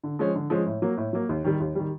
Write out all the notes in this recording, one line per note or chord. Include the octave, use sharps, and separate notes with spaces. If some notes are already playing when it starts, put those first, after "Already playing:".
D3
F3 G#3 C#4
D3
F3 G#3 C#4
A2
F#3 A#3
A2
F#3 A#3
D#2
D#3 G3
D#2
D#3 G3